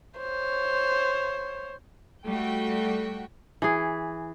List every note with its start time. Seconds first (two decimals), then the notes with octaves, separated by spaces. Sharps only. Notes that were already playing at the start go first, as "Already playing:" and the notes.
0.18 C5 C#5
2.27 G3 A3 F#4 G5
3.62 E3 G#4